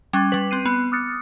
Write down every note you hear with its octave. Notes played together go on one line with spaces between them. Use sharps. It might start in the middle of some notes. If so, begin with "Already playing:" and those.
G3 C#4 F#6 G#6 A6
G3 B4
C4 F#6 C7 D#7
B3
D6 D#6 F6 F#6 A6 C#7